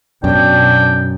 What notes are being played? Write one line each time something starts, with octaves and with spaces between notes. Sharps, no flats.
F#2 B2 D4 G5